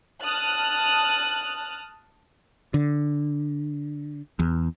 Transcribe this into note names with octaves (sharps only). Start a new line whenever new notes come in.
A5 D#6 F6 F#6
D3
E2